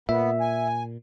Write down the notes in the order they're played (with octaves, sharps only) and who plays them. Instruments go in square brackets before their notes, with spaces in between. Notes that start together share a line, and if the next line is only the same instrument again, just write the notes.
[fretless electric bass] A#2 [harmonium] B3 [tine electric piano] E5
[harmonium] G#5